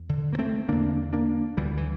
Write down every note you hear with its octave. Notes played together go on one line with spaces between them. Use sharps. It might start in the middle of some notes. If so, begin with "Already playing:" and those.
Already playing: E2
D3
A#3
A3 C4
E2 D3 A#3 D4
A#3 D4
D2 D3 E3 G3
E3